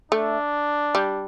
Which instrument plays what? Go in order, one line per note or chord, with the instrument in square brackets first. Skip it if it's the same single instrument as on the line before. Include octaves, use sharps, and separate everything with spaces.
[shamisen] A3 [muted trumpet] D4
[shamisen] G3